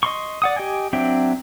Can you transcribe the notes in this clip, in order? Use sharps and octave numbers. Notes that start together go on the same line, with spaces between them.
D#5 C6 C#6
D5 F#5 D#6
G4 D#5 G5 G#5
F#3 C4 D4 E5 G5